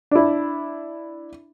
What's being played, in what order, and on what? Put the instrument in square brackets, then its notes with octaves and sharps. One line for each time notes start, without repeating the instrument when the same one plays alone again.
[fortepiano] D4 E4